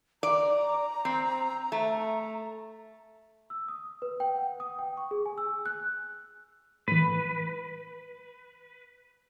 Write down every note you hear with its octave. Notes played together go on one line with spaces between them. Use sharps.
D5 A#5
C4
A3
E6
D#6
B4
G5
F#5
D#6
G5
C#6
G#4
G#5
E6
F#6
A2 E3 B4